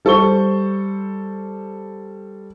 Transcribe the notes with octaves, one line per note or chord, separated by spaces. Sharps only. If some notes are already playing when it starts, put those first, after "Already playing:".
G3 A4 C5 C#6 G7